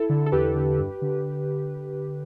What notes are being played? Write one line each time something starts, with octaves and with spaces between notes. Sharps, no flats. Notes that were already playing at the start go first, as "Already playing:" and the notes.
Already playing: E4 A4
D3
A4
E2 G4 B4
D3
G2
D3